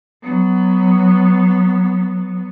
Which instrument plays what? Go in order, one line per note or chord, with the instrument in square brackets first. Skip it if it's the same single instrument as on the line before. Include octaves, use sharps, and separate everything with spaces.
[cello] F#3 B3